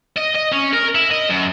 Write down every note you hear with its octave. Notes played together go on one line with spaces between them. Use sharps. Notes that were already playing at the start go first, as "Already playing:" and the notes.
D#5
D#5
C#4
A#4
E4
D#5
F#2